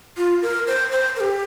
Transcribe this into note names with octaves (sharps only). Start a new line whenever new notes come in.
F4
A#4
C5
C5
A#4
G4